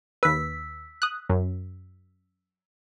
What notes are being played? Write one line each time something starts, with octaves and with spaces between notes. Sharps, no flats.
D#2 B4 E6 B6
D#6 F#6
F#2